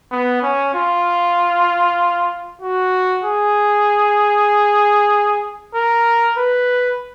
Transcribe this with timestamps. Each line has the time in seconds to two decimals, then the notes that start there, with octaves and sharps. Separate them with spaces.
0.12 B3
0.42 C#4
0.74 F4
2.62 F#4
3.24 G#4
5.75 A#4
6.38 B4